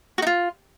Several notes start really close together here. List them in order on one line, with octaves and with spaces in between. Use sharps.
F#4 D#4 F4